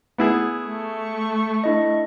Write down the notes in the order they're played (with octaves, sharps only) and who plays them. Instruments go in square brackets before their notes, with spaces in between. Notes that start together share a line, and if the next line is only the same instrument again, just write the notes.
[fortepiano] B3 E4 G#4
[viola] A3 C#6
[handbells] D4 E4 D#5